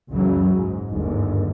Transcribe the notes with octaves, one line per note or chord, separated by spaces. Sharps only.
F#1 C#2 F#2 C#3 E3 F#3
G#2
G1 D#2 G#2